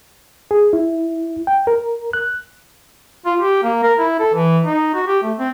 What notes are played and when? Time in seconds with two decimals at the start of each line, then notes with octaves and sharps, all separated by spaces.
0.51 G#4
0.73 E4
1.47 G5
1.67 A#4
2.13 F#6
3.26 F4
3.40 G4
3.63 A#3
3.83 A#4
3.99 E4
4.20 A4
4.34 E3
4.64 D#4
4.94 F#4
5.08 G4
5.23 A3
5.39 C4